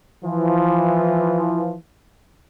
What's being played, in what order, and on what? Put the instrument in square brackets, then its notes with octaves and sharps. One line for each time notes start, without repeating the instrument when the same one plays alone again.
[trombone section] E3 F3